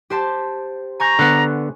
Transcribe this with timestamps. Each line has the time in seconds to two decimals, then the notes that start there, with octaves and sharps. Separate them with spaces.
0.10 G4 C5 A5
1.00 G#5 A#5 C#6 G6
1.19 D3 B3 F#6